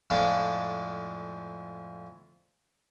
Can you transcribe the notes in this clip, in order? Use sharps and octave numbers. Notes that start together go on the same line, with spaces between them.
F2 A2 F3 G#3 D4 A5